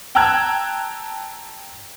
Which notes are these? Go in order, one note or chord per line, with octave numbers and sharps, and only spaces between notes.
G5 A5 A#5 E6 F#6 G#6